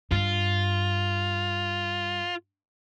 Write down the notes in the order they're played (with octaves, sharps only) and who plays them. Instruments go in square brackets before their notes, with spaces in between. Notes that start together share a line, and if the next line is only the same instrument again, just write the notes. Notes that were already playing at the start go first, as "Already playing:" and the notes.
[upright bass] G2 [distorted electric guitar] F4